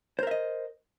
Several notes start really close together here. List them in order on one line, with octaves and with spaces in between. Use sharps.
C5 A#4 E5 D#5